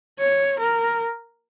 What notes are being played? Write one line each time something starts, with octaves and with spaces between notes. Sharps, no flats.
C#5
A#4